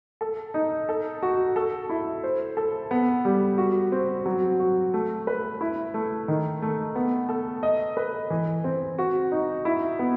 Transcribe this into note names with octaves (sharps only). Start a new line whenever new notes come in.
A4
D#4
A4
F#4
A4
E4
C5
A4
B3
G3
F#4
C4
F#3
F#4
A3
B4
E4
A3
D#3
A3
B3
A4
D#5
B4
E3
C4
F#4
D#4
E4
B3